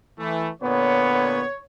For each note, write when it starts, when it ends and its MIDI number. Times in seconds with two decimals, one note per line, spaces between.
0.18 0.48 52
0.18 0.48 57
0.62 1.43 46
0.62 1.43 50
0.62 1.43 59
0.62 1.62 73